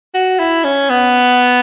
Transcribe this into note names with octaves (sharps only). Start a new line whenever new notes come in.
F#4
E4
C#4
B3